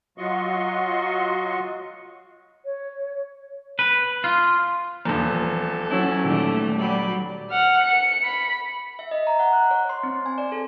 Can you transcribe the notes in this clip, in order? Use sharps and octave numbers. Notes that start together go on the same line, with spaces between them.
F#3 F4 F#4 D#5 C6 C#6
C#5
B4
F4
D#1 E2 F3 A4
F#3 C#4 E4
A#2 D#3 G3 A3
F#3 G3 B5
F#5 F6
C#7
B5
E5
D#5
A#5
F#5
F#6
C#5
C6
C4
G#5
D5
A4